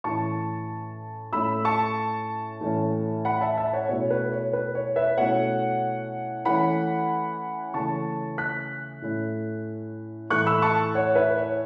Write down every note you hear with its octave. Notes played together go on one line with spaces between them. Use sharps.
A2 E3 C#4 A5 C#6
A2 A3 C#4 E4 B5 E6
A5 C#6
A2 E3 A3 C#4
F#5 B5
E5 A5
E5 A5
C#5 F#5
B2 A3 C#4 E4 C#5
B4
C#5
B4
C#5
B4 E5
B2 A3 C#4 E4 C#5 F#5
E3 A3 C#4 F#5 B5
C#3 E3 A3 C#4 A5 C#6
F#6 B6
A2 A3 C#4 E4
A2 E3 A3 E4 C#6 F#6
B5 E6
A5 C#6
C#5 F#5
B4 E5
C#5